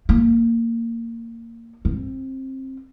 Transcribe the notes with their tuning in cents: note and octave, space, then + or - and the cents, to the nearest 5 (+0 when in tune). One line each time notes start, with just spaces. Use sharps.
A#3 -20
C4 +20